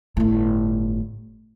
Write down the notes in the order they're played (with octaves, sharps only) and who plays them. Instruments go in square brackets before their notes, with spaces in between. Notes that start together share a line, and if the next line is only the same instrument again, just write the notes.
[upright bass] G1 A2